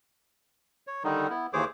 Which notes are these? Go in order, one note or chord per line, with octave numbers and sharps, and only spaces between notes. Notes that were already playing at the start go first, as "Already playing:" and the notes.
C#5
D3 D#3 G3 D#4
B3 E4
D#2 E3 G#4 C5 C#5 D6